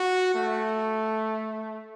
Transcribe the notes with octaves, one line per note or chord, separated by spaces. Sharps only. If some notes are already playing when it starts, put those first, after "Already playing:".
Already playing: F#4
A3